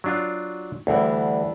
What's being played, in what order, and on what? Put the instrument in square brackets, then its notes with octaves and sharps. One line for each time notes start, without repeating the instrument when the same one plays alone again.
[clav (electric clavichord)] F#3 D4 F4
[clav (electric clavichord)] D2 [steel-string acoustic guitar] E3 G3 D4